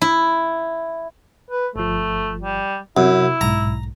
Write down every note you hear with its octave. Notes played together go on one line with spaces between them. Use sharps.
E4
B4
G1 F3 A3
G3
F#2 C3 E4
B1 G#2 A#5